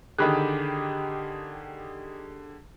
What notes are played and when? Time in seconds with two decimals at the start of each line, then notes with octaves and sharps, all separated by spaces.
0.18 D3 D#3 G4 G#4 B5 F#6